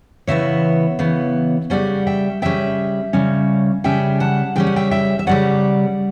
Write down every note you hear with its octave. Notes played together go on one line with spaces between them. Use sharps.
C#3 E3 B3 C#5 E5
C#3 E3 B3
C#3 G3 C#4 D5 F#5
E5 G5
C#3 G3 C#4 E5 G5
C#3 G3 C#4
C#3 G3 C#4 E5 G5
F#5 A5
C#3 G3 C#4 G5
F#5
E5 G5
E5 G5
E5
C#3 G3 C#4 D5 F#5